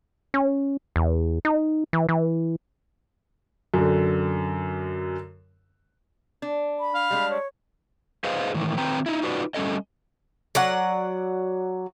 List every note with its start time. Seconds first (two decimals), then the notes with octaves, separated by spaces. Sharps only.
0.34 C#4
0.96 E2
1.45 D#4
1.93 E3
2.09 E3
3.74 F#2 D3
6.42 D4
6.80 B5
6.95 F5
7.11 G3 G#3 D4
7.30 C#5
8.24 G#4 B4 C5 D#5 F5
8.54 A2 D#3 E3
8.78 D#3 C4 B4 G5 A#5
9.06 D#4 E4
9.22 D#4 F4 F#4 B4 C#5 D5
9.54 G3 A3 C#4 A4 A#4 D#5
10.55 F#3 D5 F#5